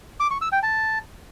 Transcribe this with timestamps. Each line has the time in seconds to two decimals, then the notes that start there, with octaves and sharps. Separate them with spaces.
0.20 D6
0.31 C#6
0.41 E6
0.52 G5
0.63 A5